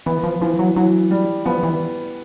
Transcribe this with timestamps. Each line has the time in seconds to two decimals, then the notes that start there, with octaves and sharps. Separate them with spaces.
0.06 E3 B3
0.23 F3
0.41 E3 F3
0.59 F#3
0.76 E3 F#3
1.11 G3
1.45 F3 B3
1.63 E3